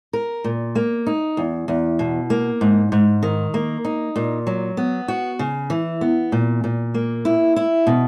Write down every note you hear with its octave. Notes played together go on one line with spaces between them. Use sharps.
A#4
A#2
A#3
D#4
E2
E2
B2
A#3
G#2
G#2
D#3
A#3
D#4
A#2
F#3
B3
F#4
C#3
E3
B3
A#2
A#2
A#3
E4
E4
B2